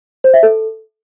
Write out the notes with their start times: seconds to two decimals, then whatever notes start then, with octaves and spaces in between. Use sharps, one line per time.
0.24 C5
0.34 E5
0.43 A4